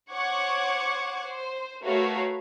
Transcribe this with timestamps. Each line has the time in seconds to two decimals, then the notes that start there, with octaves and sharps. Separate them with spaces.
0.12 C5 C#5 F#5 C#6 D6 G#6
1.26 C5
1.84 A3 F#4 A#4 B4 C#5 F5